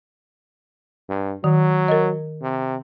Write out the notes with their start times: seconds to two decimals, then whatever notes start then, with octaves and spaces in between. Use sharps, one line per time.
1.09 G2
1.44 D#3 F#3
1.88 A#4 D#5
2.42 C3